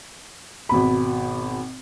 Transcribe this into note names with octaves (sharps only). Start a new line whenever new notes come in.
G#1 B2 B5